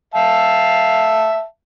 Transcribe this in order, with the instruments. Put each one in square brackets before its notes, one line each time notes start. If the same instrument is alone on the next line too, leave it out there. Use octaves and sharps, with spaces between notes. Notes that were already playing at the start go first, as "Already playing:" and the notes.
[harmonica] E5 F5 A5